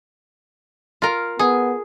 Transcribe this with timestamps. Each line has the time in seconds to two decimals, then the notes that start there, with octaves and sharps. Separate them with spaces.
1.02 F4 A#4
1.39 B3 G#4